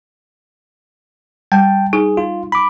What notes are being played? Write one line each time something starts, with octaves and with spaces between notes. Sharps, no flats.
G3 G5 A5
D#4 G#4
F4
B5 D6